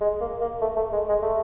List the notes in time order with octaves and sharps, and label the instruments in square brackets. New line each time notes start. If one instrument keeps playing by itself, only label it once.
[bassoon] G#3
A#3
A#3
A3
A3
G#3
G#3
A3